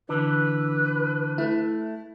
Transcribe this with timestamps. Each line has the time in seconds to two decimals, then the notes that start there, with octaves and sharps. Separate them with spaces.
0.09 D3 E3 B4
1.38 A3 E4